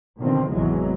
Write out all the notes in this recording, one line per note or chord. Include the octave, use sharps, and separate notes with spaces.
B2 D3 D#3 F3 C4
G#1 E2 C3 E3 F#3 G#3